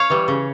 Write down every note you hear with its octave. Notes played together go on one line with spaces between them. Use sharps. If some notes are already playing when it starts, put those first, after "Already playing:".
Already playing: C#5 F5
E3 G3
C#3